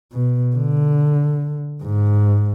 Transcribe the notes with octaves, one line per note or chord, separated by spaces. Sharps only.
B2
D3
G#2